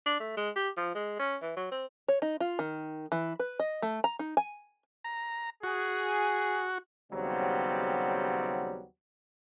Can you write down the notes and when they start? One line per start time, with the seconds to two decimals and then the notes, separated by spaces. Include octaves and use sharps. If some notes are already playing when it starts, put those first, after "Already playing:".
0.06 D4
0.20 A3
0.37 G#3
0.56 G4
0.77 F3
0.95 G#3
1.19 C#4
1.42 E3
1.57 F#3
1.72 C4
2.08 C#5
2.22 D#4
2.40 F4
2.59 D#3
3.12 E3
3.39 B4
3.59 D#5
3.82 A3
4.04 A#5
4.19 D#4
4.37 G#5
5.04 A#5
5.64 F#4 G#4
7.12 D#2 C#3 F#3 G3 B3 C4